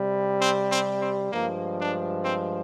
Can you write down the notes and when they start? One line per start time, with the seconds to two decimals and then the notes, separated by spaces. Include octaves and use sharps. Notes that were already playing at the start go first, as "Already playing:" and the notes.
Already playing: C3 G3
0.40 C4
0.71 C4
1.01 C4
1.31 G2 F3 G#3 A#3
1.78 D4
2.24 C4